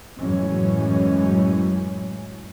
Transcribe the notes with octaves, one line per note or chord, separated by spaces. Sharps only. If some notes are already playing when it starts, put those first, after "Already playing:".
F#2 A2 E3 F#3 G#3 C#4